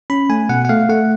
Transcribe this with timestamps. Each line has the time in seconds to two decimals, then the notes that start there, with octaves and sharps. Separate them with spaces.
0.10 C#4 B5
0.30 A3 G#5
0.49 B2 F#5
0.65 F#5
0.69 A3 F5
0.89 A3 F#5